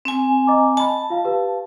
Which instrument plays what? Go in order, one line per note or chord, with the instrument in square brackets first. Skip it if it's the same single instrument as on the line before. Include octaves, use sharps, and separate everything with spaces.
[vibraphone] C4 G#5
[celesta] D#5 A#5 D6
[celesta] D#5 B5 [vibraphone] A5
[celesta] F4 F5
G4 B4 F5